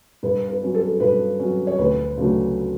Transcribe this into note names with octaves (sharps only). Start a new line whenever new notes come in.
G2 B4
B4
F#3 C#4
A4
G2 B4
F#3 C#4
C#5
D2 B4
C#3 F#3 A3 D4